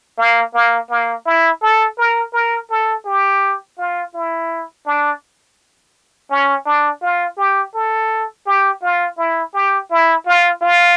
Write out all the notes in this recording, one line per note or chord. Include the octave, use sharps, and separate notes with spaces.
A#3
A#3
A#3
E4
A4
A#4
A#4
A4
G4
F4
E4
D4
C#4
D4
F4
G4
A4
G4
F4
E4
G4
E4
F4
F4